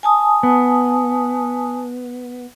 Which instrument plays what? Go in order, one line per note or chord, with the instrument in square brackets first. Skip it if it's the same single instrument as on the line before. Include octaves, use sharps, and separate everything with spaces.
[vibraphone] G#5 A5 D#6
[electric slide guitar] B3